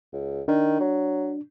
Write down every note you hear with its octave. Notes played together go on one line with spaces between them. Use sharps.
C#2
D#3 D4
F#3